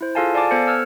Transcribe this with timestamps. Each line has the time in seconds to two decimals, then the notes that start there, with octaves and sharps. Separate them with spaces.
0.01 E4 C5
0.15 F4 G#4 A4 F5 G#5 A5
0.34 D5 F5 G#5 A5 D6
0.51 B3 A4 C5 C#7
0.67 E6 F6 G#6